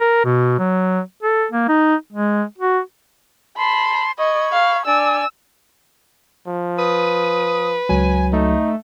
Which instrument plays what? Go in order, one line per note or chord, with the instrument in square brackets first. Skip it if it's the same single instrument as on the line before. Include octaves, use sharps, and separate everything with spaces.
[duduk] A#4
B2
F#3
A4
A#3
D#4
G#3
F#4
[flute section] A5 C6 [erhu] B5
[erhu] D#5 [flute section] B5 C#6 G#6
[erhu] F5
[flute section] D4 D5 G#5 [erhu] E6
[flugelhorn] F3
[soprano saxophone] B4 [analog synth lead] D#6
[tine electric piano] C#2 F#3 [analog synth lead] G#5
[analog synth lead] A3 [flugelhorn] D#4